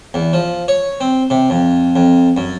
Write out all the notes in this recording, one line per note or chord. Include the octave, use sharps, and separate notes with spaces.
E2
F3
C#5
C4
C3
F2
F2
F#2